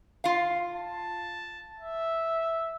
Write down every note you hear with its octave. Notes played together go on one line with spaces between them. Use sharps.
F4 F5
A5
E5